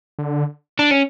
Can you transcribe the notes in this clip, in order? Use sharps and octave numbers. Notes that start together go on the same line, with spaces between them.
D3
D4
C#4